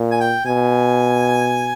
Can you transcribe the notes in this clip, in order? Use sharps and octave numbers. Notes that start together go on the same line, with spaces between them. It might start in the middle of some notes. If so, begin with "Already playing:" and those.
Already playing: A#2
G#5
G5
B2 G#5